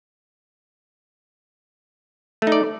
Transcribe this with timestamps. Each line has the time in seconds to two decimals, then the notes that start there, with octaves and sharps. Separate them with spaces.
2.42 A3
2.47 D#4
2.52 D5